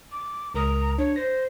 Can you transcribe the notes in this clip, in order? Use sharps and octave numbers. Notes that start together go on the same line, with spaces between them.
D6
C#2 A#4 A#5 D#6
D4 C#5
C5 A#6